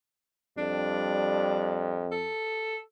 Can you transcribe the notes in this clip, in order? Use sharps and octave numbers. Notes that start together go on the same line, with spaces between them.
F2 G3 D4
A4